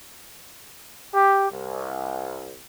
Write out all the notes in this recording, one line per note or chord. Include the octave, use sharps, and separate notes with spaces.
G4
C2